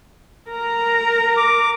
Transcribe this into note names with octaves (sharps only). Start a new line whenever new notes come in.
A#4 A#5
D6